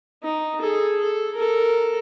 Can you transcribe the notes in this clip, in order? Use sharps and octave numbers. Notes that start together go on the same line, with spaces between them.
D#4
G#4 A4
A4
A4 A#4